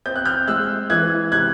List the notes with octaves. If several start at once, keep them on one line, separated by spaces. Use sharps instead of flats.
C4 G6
F#6
F6 G6
G#3 E6 F#6
E3 F#6 G#6
C3 F#6 G#6